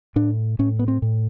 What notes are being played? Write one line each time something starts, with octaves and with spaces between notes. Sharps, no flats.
A2 D4
A2 C#4
B3
C4
A2